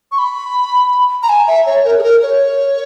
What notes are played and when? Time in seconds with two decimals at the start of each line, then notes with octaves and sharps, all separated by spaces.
0.12 C#6
0.19 B5
1.23 A#5
1.29 G#5
1.48 E5
1.66 C#5
1.85 A#4
1.98 G#4
2.03 A#4
2.22 C#5